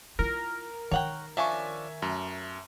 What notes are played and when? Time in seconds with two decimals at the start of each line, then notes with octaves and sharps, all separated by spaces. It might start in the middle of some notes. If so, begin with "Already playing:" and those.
0.19 E4 F4 A#4
0.91 D#3 C#5 F#5 G5
1.37 F3 C#4 D4 E5 G#5 C#6
2.02 F#2 A3